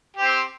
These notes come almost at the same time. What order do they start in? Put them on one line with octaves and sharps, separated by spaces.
G4 C5 C4